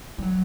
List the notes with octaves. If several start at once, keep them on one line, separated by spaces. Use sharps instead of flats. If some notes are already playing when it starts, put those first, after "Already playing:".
G3
F#3